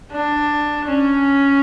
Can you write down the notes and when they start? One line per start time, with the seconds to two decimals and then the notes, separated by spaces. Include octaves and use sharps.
0.11 D4
0.85 C#4